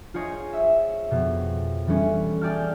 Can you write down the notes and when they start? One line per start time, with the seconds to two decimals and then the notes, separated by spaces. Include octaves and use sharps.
0.14 F4 G#4 C5 C#5 D#5
0.53 E5 E6
1.11 F2 B2
1.87 E3 G3 A3 C#4
2.41 G#4 D5 G5 A5 F6